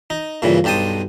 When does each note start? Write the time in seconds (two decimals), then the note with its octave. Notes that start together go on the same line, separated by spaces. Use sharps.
0.10 D#4
0.42 G2 A#2 C#3 E3
0.64 B1 G2 G4 A5 C6 D#6